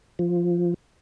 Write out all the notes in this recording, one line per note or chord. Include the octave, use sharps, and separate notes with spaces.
F3